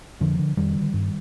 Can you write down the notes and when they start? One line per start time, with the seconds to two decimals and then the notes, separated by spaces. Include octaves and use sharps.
0.20 F2 D3 F3
0.39 D3
0.57 F2 D#3 G3
0.75 D3
0.93 G2